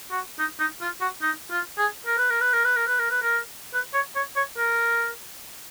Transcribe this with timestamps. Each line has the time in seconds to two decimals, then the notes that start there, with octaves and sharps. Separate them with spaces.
0.11 F#4
0.39 D#4
0.60 D#4
0.81 F4
1.01 F#4
1.22 D#4
1.51 F4
1.78 G#4
2.06 A#4
2.18 B4
2.30 A#4
2.41 B4
2.53 A#4
2.64 B4
2.76 A#4
2.87 B4
2.99 A#4
3.11 B4
3.22 A#4
3.74 B4
3.94 C#5
4.16 C#5
4.36 C#5
4.58 A#4